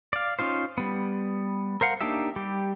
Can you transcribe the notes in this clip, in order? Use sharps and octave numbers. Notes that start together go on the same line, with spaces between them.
D5 F5
C#4 D#4 F4 C5
G3 B3
A#4 C5 F5 F#5
A#3 D4 D#4 G4 E5
G3 G4